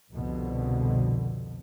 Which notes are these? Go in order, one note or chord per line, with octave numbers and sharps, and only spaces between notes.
C2 F2 B2 D3